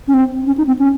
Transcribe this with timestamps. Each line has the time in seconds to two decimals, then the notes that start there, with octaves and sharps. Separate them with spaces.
0.08 C#4
0.14 C4
0.46 C#4
0.58 D#4
0.67 C4
0.79 C#4